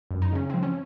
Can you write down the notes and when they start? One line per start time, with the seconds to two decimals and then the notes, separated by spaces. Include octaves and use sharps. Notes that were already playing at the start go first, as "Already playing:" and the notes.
0.11 F#2
0.22 D#4
0.32 C#3 C#4
0.50 F3 C4
0.63 C#4